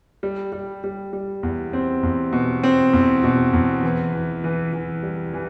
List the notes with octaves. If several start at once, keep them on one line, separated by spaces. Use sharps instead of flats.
G3
G3
G3
G3
E2
C4
E2
B2
C4
E2
B2
E2
E3
E3
E3
E3
G3
E3